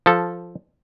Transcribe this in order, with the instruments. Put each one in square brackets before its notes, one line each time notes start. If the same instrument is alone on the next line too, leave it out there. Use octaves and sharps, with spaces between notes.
[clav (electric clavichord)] F3 A4